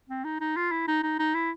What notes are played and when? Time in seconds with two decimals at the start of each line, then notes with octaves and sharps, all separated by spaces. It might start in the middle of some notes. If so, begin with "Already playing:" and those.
0.09 C4
0.24 D#4
0.40 D#4
0.56 F4
0.71 E4
0.88 D#4
1.03 D#4
1.19 D#4
1.35 E4